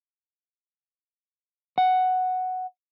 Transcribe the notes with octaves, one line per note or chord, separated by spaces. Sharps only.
F#5